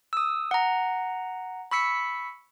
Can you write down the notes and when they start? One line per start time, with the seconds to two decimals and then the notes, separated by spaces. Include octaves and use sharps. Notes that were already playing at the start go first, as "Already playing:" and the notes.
0.13 D#6 E6
0.51 F#5 A#5
1.71 B5 C#6 E6 B6 C#7